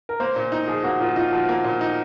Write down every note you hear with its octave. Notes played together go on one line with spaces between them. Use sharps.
A#4
A#3 C5
A#2
D#4
F3 G#4
A#3 F#4
A#2 F4
D#4 F4
F3 F#4
A#3
A#2
D#4